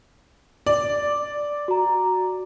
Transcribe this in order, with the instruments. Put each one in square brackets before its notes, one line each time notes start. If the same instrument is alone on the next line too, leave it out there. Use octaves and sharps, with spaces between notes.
[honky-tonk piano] D5
[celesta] F#4 A#5